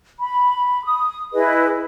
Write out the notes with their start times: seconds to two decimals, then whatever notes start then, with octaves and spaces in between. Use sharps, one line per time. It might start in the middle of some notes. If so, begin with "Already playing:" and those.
0.18 B5
0.84 D#6
1.33 E4 G#4 B4 D#5